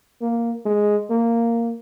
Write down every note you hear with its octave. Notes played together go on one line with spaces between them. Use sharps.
A#3
G#3
A#3